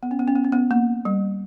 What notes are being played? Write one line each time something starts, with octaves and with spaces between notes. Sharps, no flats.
B3
C#4
B3
C#4
B3
C#4
B3
A#3
G3